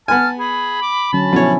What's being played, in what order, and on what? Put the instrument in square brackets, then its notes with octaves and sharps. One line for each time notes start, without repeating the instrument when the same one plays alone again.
[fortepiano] B3 G#5 [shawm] A5 [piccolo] F6
[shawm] G#4 [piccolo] B5
[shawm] D6
[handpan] D3 F#3 C#4 [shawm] A5
[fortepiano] B2 C#5 [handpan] F3 C#4 E4